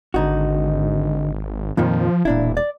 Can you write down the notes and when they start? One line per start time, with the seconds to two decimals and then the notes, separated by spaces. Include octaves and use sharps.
0.14 G#1 D3 D#4 F#4
1.77 F2 A#2 D#3 F3
2.25 E1 A#2 D4 E4
2.57 D5